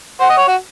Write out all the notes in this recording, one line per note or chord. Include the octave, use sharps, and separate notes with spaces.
C5 F#5
D#5
C#5
F#4